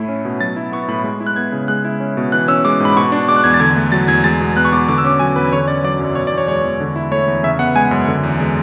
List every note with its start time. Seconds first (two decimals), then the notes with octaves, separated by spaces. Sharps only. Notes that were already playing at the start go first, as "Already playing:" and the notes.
Already playing: A2 A3 E4
0.09 C#4
0.25 B2
0.41 F#3 A6
0.56 E4
0.72 B3 C#6
0.88 A2 B5
1.04 G#3
1.20 E4
1.27 F#6
1.36 B3 G#6
1.52 C#3
1.68 G#3 F#6
1.85 E4
2.00 C#4
2.17 B2
2.32 E3 F#6
2.48 C#4 E6
2.65 G#3 D6
2.80 G#2 B5
2.96 B2 C#6
3.12 D4
3.28 G#3 D6
3.37 F#6
3.44 E2 G#6
3.54 A6
3.60 D3 G#6
3.76 A3
3.92 F#3 A6
4.08 E2 G#6
4.24 G#3 A6
4.40 B2
4.56 B3 F#6
4.65 C#6
4.72 B2 D6
4.88 D3 D6
4.98 E6
5.05 C#4 D6
5.19 F#3 G#5
5.35 E2 B4
5.53 D3 C#5
5.68 C#4 D5
5.84 F#3 D5
5.99 F#2
6.15 B2 C#5
6.27 D5
6.32 E2
6.38 C#5
6.48 G#3 C#5
6.64 E2
6.80 D3
6.96 E4
7.12 A3 C#5
7.28 E2
7.43 C#3 E5
7.59 B3 F#5
7.76 G#3 G#5
7.91 F#2
8.08 D3
8.23 E2
8.40 G#3